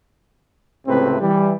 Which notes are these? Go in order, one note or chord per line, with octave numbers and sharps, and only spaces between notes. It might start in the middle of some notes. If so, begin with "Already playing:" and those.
C#2 A2 C3 C4 B4
E3 G3